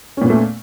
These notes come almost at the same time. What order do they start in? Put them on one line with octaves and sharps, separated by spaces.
C#4 A#2 B3 A3